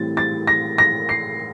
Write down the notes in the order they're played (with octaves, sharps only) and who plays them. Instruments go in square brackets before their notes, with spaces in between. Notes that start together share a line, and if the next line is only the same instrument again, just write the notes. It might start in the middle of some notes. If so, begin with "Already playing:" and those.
Already playing: [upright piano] A2 E3 G3 C4 A6
A6
A#6
A#6
C7